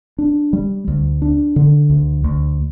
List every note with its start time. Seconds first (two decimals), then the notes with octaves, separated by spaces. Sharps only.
0.18 D4
0.53 G3
0.88 D2
1.22 D4
1.56 D3
1.90 D2
2.24 D2